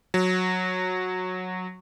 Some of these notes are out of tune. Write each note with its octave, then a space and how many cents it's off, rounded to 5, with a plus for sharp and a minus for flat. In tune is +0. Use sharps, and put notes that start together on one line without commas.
F#3 -10